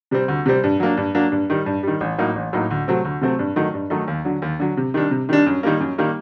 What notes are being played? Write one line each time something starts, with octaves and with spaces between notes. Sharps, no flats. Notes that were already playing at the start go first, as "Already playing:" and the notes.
C3 G3 C4
D2
C3 G3 C4
G2
F#3 A#3 D4
G2
F#3 A#3 D4
G2
D#3 G3
G2
D#3 G3
A1
A2 F#3 A#3 D#4
A1
A2 F#3 A#3 D#4
D2
C3 F#3 A3 C4
D2
C3 F#3 A3 C4
G2
D#3 F#3 A3 D#4
G2
D#3 F#3 A3 D#4
D#2
D3 F#3
D#2
D3 F#3
C3
D#3 G3 D4
C3
D#3 G3 D4
F#2
D#3 G3 A#3
F#2
D#3 G3 A#3